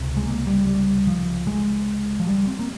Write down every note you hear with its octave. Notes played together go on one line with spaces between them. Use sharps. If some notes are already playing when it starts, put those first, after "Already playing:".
Already playing: C#2 C3
G#3
A#3
G3
G3
F3
G#3
F3
G3
C4
A#3